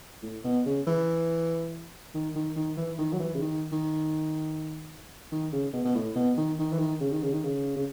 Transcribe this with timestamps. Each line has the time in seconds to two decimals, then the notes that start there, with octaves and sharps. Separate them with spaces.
0.23 A2
0.44 B2
0.66 C#3
0.87 E3
2.14 D#3
2.35 D#3
2.56 D#3
2.77 E3
2.98 D#3
3.13 F#3
3.19 E3
3.35 C#3
3.41 D#3
3.72 D#3
5.32 D#3
5.53 C#3
5.73 B2
5.85 B2
5.95 A2
6.16 B2
6.37 D#3
6.59 D#3
6.72 E3
6.79 D#3
7.01 C#3
7.12 D#3
7.23 C#3
7.33 D#3
7.44 C#3
7.76 C#3